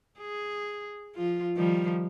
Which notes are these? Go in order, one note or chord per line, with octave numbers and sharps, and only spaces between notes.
G#4
F3 F4
D#3 F3 G3